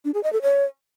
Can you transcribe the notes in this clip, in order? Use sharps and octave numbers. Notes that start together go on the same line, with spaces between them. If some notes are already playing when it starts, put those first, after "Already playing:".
D4
G#4
D#5
A4
C#5